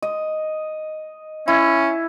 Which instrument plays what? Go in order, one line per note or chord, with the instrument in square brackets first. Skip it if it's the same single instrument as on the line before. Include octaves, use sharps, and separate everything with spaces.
[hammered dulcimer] D#5
[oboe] C#4 [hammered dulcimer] E4